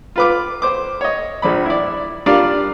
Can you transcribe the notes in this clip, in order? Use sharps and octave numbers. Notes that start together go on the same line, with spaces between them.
F4 B4 D6
C5 D6
C#5 D#5
A#1 F3 D5 B5
E4 D5
G3 D4 F4 A#4 D5 F5